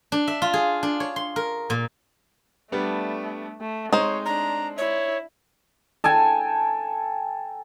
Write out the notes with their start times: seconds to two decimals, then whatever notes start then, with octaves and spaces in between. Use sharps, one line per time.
0.12 D4
0.27 E5
0.42 F4
0.54 G#4
0.83 D4
1.00 C#5
1.16 C6
1.36 A#4
1.70 A#2
2.72 G3 A3 B3 D4
3.61 A3
3.93 G#3 C4 D#4 C5 C#5
4.26 D4 A#5
4.78 E4 C#5
6.04 A4 G5 G#5